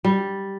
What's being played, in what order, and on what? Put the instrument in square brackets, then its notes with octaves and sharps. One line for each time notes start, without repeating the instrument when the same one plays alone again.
[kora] G3